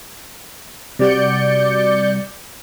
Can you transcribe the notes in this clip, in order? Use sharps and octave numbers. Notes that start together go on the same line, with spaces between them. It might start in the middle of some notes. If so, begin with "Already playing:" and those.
C3 G3 F#4 D5 G6 C#7